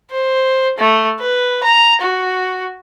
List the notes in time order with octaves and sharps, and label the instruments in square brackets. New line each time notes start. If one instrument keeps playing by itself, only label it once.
[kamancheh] C5
A3
B4
A#5
F#4